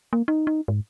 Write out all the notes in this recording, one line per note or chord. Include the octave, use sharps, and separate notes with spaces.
A#3
D#4
D#4
G#2